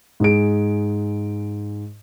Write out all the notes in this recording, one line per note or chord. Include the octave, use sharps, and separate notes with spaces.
G#2 G#4 D7